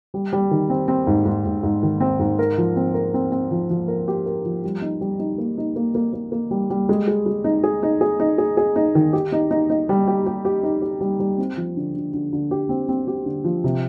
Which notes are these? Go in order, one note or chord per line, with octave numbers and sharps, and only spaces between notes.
G3
G3
D#3
C4
C4
G#2
G#2
G#2
G#2
D#3
C4
G#2
A#4
F3
C4
A#4
C4
C4
F3
F3
A#4
G4
A#4
F3
G3
D#4
G3
D#4
A#3
D#4
A#3
A#3
A#3
A#3
G3
G3
G#3
G#4
G#3
D#4
G#4
D#4
G#4
D#4
G#4
G#4
D#4
D#3
G4
D#4
D#4
D#4
G3
G4
G4
G4
D#4
G4
G3
G3
C4
F3
D3
D3
D3
D3
G4
C4
C4
G4
D3
F3
C3